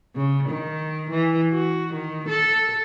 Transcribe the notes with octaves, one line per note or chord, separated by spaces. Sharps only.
C#3
D#3
E3
F#4
D#3
A4